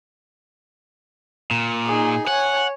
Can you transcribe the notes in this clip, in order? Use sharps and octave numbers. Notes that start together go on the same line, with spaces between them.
A#2
D#4 G#4
C#5 F#5 G#5